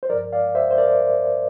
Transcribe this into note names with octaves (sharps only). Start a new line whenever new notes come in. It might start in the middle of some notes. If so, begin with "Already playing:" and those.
C5
G2 F3 A#4 D5
D5 F5
C5 E5
C5
A#4 D5